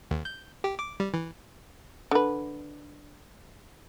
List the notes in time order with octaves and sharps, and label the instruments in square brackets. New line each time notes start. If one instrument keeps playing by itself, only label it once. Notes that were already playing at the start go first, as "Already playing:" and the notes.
[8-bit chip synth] D#2
G6
G4
D6
G3
E3
[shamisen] D3 B4